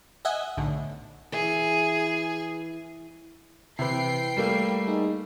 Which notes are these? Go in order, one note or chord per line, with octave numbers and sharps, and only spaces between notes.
D#5 E5 F#5 G#5
B1 A2 D3
E3 G#4
C3 E3 E4 B4 G5 C7
G3 A3 A#3
D#4 G#4